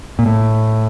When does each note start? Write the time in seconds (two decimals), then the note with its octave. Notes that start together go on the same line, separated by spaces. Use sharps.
0.19 A#2
0.26 A2